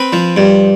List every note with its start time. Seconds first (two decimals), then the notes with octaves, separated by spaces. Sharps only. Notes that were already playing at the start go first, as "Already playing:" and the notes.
Already playing: C4 B4
0.13 F3
0.36 G2